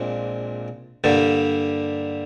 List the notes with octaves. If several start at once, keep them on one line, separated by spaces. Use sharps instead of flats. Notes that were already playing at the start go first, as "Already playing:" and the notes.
Already playing: A#1 A#2 G#3 C4
G2 D3 G3 A#3